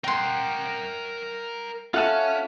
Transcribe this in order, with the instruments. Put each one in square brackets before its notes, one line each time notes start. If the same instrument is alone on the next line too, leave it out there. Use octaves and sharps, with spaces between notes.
[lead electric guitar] A#4 F#5 [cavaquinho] G5 C6
[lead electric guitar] C#4 [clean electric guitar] F4 F#5 A5 [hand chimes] A4 E5